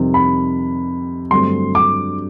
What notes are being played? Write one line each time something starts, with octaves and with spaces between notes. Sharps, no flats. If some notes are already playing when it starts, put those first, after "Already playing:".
Already playing: F2 C3 D#3 G3 C4
B5
G2 D3 F#3 A3 C4 C6
D6